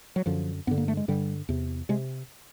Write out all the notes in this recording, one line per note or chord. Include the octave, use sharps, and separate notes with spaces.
F#3
F#2 D3 F3
G2 D3 B3
A#3
A3
G#3
G2 D3 G3
E2 C3
C3 G#3